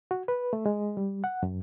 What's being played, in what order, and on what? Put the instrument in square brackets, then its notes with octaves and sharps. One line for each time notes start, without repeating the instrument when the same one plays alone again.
[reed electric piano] F#4
B4
A3
G#3
G3
F#5
F#2